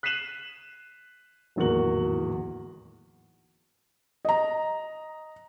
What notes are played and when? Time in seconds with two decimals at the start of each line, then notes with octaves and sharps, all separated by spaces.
0.03 F#6 B6 C7 D#7 E7 F#7
1.56 D1 G#1 E2 A#3 F#4 F#7
4.25 D#5 A#5